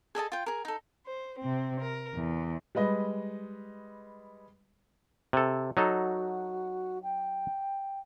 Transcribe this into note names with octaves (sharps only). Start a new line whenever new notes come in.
G#4 A4 D#5 A5
F4 G5
G#4 A#4
D#4 A4
C5
C3 C4
A#4
E2
G3 G#3 B4 D#5
C3 A4
F#3 D#4 F#4 A4
G5